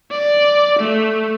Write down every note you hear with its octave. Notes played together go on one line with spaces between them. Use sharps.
D5
A3